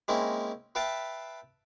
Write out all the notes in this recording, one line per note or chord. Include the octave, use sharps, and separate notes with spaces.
G#3 A#3 C4 C#4 E4
B4 E5 F5 G5 A5